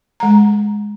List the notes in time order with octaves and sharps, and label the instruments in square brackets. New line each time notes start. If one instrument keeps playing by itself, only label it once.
[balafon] G#3 A#5